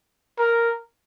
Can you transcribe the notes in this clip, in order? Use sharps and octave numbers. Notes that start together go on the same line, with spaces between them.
A#4